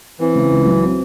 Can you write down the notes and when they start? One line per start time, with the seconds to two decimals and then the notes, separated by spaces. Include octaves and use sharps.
0.19 E3 C4
0.35 C#3
0.51 C#2
0.66 F#3
0.82 C4